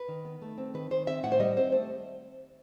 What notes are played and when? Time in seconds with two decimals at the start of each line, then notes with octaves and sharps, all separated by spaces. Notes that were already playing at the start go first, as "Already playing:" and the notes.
Already playing: B4
0.08 D#3
0.25 B3
0.42 A3
0.58 C4
0.74 D#3 B4
0.91 D#3 C5
1.07 C4 E5
1.23 A2 F#5
1.32 C5
1.40 G3 D#5
1.57 C4 C5
1.72 A3 C5